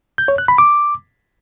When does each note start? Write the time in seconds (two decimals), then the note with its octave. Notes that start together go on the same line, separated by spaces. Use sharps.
0.18 G6
0.28 C#5
0.38 F#6
0.48 B5
0.58 D6